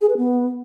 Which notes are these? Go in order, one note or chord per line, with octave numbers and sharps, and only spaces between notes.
G#4
B4
B3